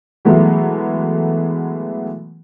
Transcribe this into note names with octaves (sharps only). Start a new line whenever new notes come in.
B2 E3 F#3 G#3 A3 B3